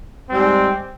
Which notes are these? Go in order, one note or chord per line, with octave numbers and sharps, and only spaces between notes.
G#2 G3 C4